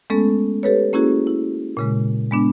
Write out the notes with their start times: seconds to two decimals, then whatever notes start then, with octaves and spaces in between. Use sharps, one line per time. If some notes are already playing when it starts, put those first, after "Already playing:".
0.10 G#3 A3 B3 C#4 A4
0.63 G4 A4 B4 C#5
0.93 A#3 C#4 E4 F#4 G#4
1.27 E4
1.77 A#2 C#3 G#3
2.31 G#3 B3 D4